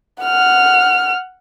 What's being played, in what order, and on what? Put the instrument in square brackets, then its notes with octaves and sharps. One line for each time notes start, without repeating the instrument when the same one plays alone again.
[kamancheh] F#5 F6